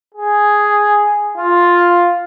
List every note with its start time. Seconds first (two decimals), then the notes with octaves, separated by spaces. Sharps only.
0.15 G#4
1.38 F4